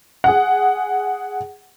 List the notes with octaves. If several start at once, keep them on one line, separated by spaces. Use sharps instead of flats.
G#4 F#5